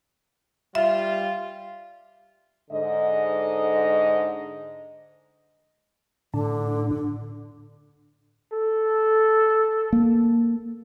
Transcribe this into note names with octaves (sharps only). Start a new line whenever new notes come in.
G3 F4 E5
G#2 D3 D#5
A2 D3 D4
A4
A#3